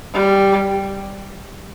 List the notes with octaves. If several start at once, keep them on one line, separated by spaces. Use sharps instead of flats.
G3